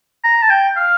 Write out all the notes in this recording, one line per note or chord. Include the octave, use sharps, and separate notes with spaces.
A#5
A5
G5
F5